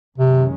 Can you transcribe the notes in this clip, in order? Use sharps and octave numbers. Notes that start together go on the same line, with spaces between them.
F#1 F#2 C3 D#3 G#3 C#4